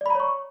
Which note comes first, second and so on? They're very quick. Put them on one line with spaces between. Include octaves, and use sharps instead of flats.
D5 B5 A#5 C#5 C#6